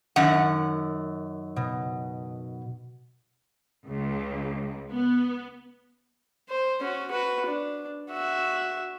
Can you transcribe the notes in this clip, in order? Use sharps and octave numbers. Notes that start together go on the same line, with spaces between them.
F#2 D#3 F#5
B2
C#2
B3
C5
C#4 F#4
F#4 B4
D4
F#4 E5